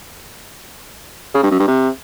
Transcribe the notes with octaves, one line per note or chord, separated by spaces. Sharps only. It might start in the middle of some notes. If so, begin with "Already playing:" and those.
C#3
G2
F#2
G2
C3